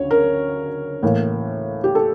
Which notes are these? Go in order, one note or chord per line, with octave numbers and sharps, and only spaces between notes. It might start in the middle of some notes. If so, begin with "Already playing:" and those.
Already playing: D2 C#3 C#5
A#4
A2 E3 A#3
G4
A4